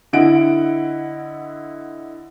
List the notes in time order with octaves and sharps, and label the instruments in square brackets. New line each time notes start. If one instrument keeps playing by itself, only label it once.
[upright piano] D3 E4 D#5 F#5 D7